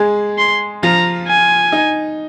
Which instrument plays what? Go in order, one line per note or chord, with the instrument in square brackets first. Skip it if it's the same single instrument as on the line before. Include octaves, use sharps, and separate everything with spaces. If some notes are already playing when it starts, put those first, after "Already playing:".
Already playing: [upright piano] G#3 G#4
[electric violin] C6
[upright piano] F3 F4 [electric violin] A#5
[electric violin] G#5
[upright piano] D#4